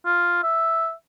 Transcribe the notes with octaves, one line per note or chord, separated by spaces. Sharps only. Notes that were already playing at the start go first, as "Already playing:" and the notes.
F4
E5